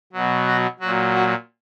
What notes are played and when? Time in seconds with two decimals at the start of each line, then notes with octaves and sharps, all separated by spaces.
0.13 B2 F#3
0.46 F#4
0.80 A#2 F#3 F#4
1.14 F#4